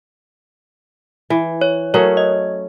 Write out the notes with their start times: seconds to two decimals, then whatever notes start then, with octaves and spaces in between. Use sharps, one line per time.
1.30 E3
1.61 C#5
1.94 F#3 A3 C#4 A#4 C#5
2.17 D#5